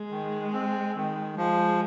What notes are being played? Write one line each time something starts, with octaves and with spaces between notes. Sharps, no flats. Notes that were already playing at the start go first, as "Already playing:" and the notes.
Already playing: G#3
D#3
C4
D#3
F3 G#3